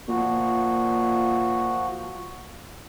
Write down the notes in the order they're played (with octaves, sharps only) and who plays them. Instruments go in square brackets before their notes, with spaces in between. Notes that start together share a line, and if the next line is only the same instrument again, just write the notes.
[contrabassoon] A#2 [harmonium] F3 F#4